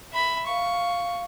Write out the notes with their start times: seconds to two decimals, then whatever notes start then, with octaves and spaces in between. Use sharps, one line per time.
0.12 E5 B5
0.47 F5 C#6